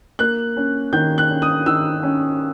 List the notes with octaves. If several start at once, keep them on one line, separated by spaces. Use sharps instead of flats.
A#3 F#6
C#4
D#3 G6
F#6
C#4
D#6
D#3 E6
C#4